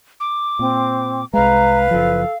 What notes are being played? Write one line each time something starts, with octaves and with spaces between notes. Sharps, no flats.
D6
A#2 C4
C2 G#3 B4 F5 A#5
F#1 F3 A4